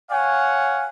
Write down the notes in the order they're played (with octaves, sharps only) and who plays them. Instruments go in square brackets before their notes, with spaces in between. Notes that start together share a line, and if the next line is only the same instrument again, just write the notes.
[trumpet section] C#5 F5 F#5 [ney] G#5